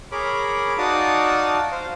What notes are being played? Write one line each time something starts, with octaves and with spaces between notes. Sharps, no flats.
G#4 A#4 C#5 B5 D6
D#4 F#4 D5 F5 A5 D#6
C5 F5